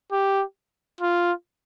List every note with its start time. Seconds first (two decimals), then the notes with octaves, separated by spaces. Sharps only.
0.12 G4
1.01 F4